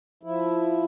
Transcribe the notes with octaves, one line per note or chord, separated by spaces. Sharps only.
F3 E4